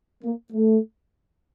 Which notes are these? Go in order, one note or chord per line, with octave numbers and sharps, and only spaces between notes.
A#3
A3